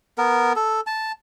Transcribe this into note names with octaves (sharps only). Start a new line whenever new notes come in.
B3 A#4
A4
A5